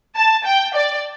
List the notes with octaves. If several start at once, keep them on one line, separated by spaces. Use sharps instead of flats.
A5
G5
D5